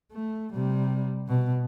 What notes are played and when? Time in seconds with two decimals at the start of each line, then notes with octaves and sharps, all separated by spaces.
0.12 A3
0.53 C3 G3
1.28 B2